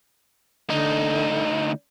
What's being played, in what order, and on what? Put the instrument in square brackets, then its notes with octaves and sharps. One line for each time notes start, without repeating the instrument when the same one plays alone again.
[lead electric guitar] D2 D#4 [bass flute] D3